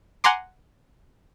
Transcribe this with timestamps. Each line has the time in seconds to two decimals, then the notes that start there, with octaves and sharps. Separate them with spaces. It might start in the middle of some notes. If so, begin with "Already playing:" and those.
0.24 F#5 G#5 A#5 C6 D6